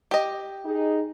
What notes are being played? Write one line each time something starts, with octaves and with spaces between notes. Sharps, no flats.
G4 D#5
D#4 G#4